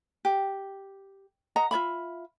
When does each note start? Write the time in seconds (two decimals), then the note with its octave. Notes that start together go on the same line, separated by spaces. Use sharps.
0.25 G4
1.56 D#5 F#5 A#5
1.71 F4 C#5 E5 B5